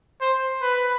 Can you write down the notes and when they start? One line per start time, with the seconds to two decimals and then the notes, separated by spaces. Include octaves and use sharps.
0.21 C5
0.62 B4